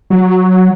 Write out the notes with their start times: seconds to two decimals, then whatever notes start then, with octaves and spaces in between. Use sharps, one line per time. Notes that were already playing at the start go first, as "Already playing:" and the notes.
0.10 F#3